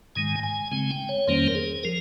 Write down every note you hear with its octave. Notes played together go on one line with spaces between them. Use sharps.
G#2 D#3 G#3 G#5
G#5
C#3 G#3 C4 G#5
G5
C#5
F2 D#3 G3 A#3 C#4 C5
A#4
G#4
F3 A#4